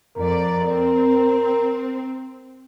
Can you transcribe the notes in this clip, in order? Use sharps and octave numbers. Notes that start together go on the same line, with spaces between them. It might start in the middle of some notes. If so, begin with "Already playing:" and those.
F2 A#4 D5
C4